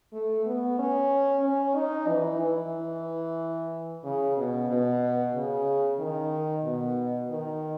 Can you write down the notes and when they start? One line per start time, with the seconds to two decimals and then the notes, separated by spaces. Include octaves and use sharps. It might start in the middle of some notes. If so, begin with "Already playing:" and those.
0.13 A3
0.46 B3
0.79 C#4
1.44 C#4
1.76 D#4
2.08 E3
2.41 E3
4.04 C#3
4.37 B2
4.69 B2
5.34 C#3
5.99 D#3
6.65 B2
7.30 D#3